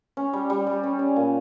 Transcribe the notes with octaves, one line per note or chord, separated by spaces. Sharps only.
C#4
G3
G3
G3
C#4
C#4
A#2